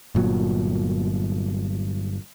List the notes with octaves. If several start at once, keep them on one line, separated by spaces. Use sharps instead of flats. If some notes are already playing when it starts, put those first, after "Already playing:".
G1 A#2 F#3